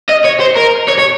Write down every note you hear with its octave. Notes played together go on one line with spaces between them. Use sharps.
D#5
C#5
C5
A#4
C#5
C#5